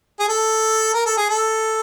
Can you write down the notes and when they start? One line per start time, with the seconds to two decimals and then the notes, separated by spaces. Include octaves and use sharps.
0.20 G#4
0.29 A4
0.94 A#4
1.06 A4
1.17 G#4
1.30 A4